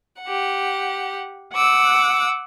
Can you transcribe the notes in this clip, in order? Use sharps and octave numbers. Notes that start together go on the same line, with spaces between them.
G4 F#5
F#5 D6 E6